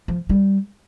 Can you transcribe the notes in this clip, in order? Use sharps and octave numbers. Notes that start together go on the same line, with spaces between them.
F3
G3